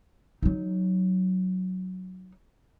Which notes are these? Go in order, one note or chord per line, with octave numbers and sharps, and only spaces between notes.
F#3 D#4